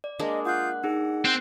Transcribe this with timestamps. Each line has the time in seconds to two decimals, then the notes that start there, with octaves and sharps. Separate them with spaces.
0.04 D5
0.19 G#3 A#3 D4 D#5
0.45 F4 F#5 D#6 F#6 G6
0.84 D#4 G#4 F#5
1.25 C4 F#6